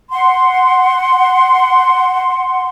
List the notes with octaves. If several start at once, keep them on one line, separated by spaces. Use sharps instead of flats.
F#5 C6